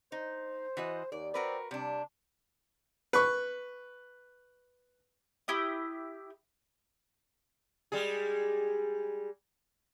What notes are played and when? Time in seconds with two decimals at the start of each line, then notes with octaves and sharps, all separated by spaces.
0.12 D#4 C5
0.77 E3 F#4 D#5
1.12 D#2 D5
1.34 C4 F#4 A#4 B4 D5
1.71 C3 G3 D4
3.13 B4 C#6
5.48 E4 G4 D#6
7.92 G3 G#3 G#4